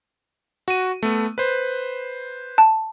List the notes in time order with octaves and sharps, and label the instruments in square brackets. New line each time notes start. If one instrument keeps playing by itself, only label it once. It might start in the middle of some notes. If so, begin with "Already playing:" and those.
[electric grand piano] F#4 D#7
A3 B3
B4 C5
[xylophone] A5